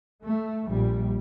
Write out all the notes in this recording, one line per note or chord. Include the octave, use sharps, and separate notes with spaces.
A3
A#1 A#2 G3